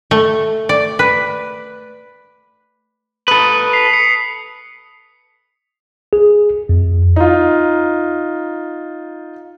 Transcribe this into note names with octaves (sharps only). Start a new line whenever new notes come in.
A3
D5
B4
A4 B4 D#6
B6 C7 F7
C#7
G#4
F2
D#4 F4